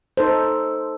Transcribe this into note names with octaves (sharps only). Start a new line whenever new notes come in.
D#4 A4 C5